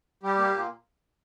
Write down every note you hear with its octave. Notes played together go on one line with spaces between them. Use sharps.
G3 G4
A#3
A#2